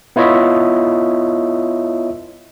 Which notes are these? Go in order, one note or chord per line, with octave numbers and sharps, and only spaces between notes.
B3 E4 F4 C#5 D#5 E5